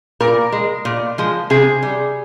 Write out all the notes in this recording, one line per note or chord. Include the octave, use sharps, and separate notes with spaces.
A#2 A#4
G#3
A#2
F3 G#3
C3 G#4
G3